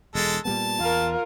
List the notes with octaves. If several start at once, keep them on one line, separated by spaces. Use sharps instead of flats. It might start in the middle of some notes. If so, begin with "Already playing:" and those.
E1 G#3 A4
A#2 G3 B3 A5
E2 F4 A#4